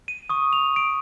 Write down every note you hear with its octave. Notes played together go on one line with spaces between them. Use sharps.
D#7
C#6 D#6
F7
D7